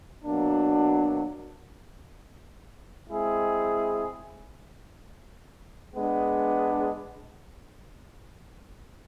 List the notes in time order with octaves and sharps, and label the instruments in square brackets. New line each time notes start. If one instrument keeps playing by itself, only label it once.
[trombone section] B2 F#3 A#3 D4
G#3 C4 E4 G#4
G#3 B3 D4